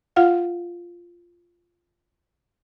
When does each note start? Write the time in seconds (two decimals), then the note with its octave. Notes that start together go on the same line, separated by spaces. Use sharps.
0.16 F4 F5 F#5